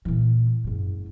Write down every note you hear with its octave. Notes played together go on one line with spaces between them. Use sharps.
A#2 E3
F#1 G#2